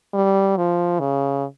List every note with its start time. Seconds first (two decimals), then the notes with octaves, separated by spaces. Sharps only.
0.14 G3
0.56 F3
1.00 C#3